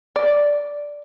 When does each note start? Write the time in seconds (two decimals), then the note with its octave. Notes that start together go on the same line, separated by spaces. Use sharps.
0.16 D5